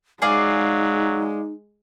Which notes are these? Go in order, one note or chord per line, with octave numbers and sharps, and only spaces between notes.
F#3 G#3 D#4 G#4 D5 F5